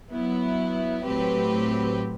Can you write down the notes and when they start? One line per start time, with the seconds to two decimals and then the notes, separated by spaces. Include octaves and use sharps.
0.11 F#3 B3 E4
1.04 A2 F#3 C4 G4 B4